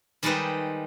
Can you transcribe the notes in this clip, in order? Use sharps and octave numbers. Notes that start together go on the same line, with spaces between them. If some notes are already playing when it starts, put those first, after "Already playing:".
D#3 G3 G#3 D#4 B4 C5